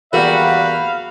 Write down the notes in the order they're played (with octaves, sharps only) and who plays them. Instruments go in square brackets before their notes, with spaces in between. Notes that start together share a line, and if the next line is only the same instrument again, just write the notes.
[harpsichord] E2 A#3 [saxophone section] G3 F#4 [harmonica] F5 [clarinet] B5